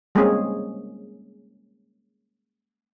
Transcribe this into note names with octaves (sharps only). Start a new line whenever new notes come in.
G3 G#3 A#3 C4 C#4 G#4